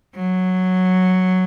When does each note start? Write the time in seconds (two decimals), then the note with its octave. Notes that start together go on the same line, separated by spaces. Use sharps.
0.16 F#3